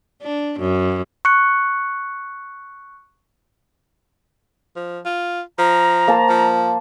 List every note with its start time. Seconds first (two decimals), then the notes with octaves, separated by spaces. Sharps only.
0.22 D4
0.59 F#2
1.25 C#6 F#6 C#7
4.76 F3
5.05 F4
5.58 F3 A#5
6.08 A#3 C5 A5
6.29 F3